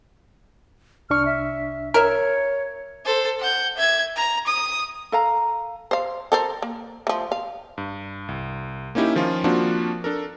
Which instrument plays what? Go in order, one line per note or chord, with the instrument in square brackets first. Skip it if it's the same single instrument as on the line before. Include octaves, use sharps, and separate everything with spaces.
[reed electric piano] C2 D4 C#6 [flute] F6
[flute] E5
[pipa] A#4 E5 [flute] C#5
[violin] A4 C5
F#5 G6
E5 G#6
A#5
D#6
[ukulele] A4 F5 A#5
[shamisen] C5 F5
A4 A#4 C5
A#3
F3 A3
F5
[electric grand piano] G2
C2
A#3 C#4 D#4 E4 G4
D#3 F3 C#4 F4
F3 A#3 C4 D4 F4 F#4
D4 A4 A#4